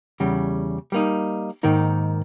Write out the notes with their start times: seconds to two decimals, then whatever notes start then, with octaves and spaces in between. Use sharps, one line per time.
0.20 E2 C#3 G3
0.92 G3 A#3 D#4
1.63 G#2 D#3 A#3 D#4